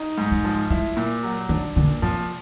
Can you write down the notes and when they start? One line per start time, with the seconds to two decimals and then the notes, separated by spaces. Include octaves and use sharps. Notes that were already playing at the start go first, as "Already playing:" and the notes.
Already playing: D#4
0.18 G#2
0.31 G#3
0.44 F3
0.70 G#3 E4
0.97 A#2
1.23 F#3
1.49 D#3 D4
1.76 A#2 D3
2.02 C3 F3